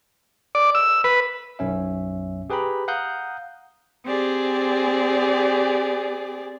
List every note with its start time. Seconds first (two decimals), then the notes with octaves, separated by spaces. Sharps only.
0.55 D5
0.75 E6
1.04 B4
1.59 B1 F#2 C#4 E5
2.50 G4 G#4 B4 G5 A#5 B5
2.88 F5 F#5 A#5 D#6 F#6 G6
4.04 C4 G4 G#4 D5